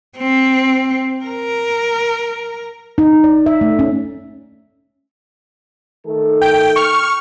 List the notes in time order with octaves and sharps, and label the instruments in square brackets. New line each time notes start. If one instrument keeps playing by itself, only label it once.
[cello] C4
A#4
[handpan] D#4
D5
E5
A3
C#4
[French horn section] D#3 A3 A4
[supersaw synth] G5
C#6 F6